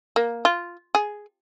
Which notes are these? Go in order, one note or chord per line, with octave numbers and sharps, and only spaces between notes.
A#3
F4
G#4